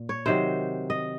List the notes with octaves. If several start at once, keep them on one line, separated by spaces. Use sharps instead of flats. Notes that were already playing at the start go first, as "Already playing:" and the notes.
Already playing: A#2
C#5
C3 D#3 F#3 C5
D#5